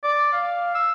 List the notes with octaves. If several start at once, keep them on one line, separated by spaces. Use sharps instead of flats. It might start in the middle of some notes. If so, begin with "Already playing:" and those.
D5
F5
E6